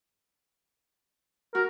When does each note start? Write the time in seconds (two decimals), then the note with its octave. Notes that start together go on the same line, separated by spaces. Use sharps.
1.55 F#4 A#4